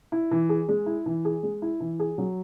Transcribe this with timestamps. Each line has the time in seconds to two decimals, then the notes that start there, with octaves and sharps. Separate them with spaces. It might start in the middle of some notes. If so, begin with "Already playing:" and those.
0.12 E4
0.31 E3
0.49 G#4
0.69 G#3
0.86 E4
1.06 E3
1.25 G#4
1.43 G#3
1.62 E4
1.80 E3
2.00 G#4
2.18 F#3